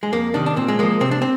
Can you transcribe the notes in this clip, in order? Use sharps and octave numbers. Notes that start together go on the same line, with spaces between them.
G#3
F2 A#3
C3 D#3 D4
D4
A#2 C4
G#3
F3 G#3 A#3
C3 C4
D4
C4